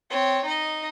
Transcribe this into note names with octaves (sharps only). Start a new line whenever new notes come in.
C4 C#5
D#4 D#5